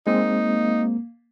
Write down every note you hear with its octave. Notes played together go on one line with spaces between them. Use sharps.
G#3 A#3 C4 D#4